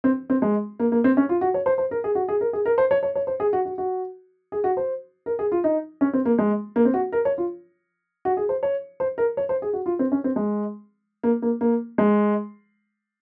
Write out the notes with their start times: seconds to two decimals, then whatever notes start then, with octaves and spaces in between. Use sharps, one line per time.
0.04 C4
0.30 C4
0.42 G#3
0.80 A#3
0.92 A#3
1.04 C4
1.17 C#4
1.29 F4
1.41 F#4
1.54 C#5
1.66 C5
1.78 C5
1.91 A#4
2.04 G#4
2.15 F#4
2.28 G#4
2.41 A#4
2.53 G#4
2.66 A#4
2.78 C5
2.91 C#5
3.03 C#5
3.15 C#5
3.27 C5
3.40 G#4
3.53 F#4
3.65 F#4
3.78 F#4
4.52 G#4
4.64 F#4
4.77 C5
5.26 A#4
5.39 G#4
5.52 F4
5.64 D#4
6.01 C#4
6.13 C4
6.25 A#3
6.39 G#3
6.76 A#3
6.85 C4
6.94 F#4
7.12 A#4
7.25 C#5
7.38 F4
8.25 F#4
8.37 G#4
8.49 C5
8.63 C#5
9.00 C5
9.18 A#4
9.37 C#5
9.49 C5
9.62 G#4
9.73 F#4
9.86 F4
9.99 C4
10.12 C#4
10.24 C4
10.36 G#3
11.23 A#3
11.42 A#3
11.61 A#3
11.98 G#3